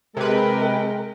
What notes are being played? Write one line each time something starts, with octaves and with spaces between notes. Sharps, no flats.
C3 G#3 A#4 B4 G5